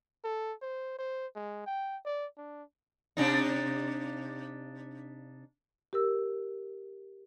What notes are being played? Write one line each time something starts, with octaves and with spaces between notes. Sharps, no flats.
A4
C5
C5
G#3
G5
D5
D4
C3 D4 D#4
G4 A#4 E6